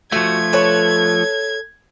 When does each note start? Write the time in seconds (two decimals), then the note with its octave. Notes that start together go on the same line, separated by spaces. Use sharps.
0.12 F3 A3 F#4 G#6
0.53 A4 B4 C#5